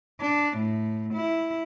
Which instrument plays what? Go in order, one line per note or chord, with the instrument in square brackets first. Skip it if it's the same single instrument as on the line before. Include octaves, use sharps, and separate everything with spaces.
[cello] D4
A2
E4